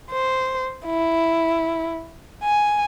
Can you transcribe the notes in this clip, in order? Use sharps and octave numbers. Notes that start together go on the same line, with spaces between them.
C5
E4
G#5